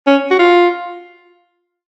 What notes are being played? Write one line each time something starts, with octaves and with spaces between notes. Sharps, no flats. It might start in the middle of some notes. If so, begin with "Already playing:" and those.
C#4
F#4
F4